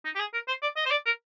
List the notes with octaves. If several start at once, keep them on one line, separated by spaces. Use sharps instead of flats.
D#4
G4
G#4
A#4
C5
D5
D#5
C5
D5
A#4